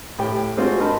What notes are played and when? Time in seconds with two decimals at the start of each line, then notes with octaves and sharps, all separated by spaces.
0.19 A2 G4 G5
0.57 G3 G#3 C4 D4 F4 F#4
0.79 G2 D#4 A#4 A5 B5 C6